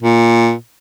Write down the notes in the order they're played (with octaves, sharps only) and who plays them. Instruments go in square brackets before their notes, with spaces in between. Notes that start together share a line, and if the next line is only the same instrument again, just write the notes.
[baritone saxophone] A#2